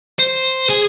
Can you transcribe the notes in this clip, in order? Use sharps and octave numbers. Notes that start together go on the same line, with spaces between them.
C5
G#4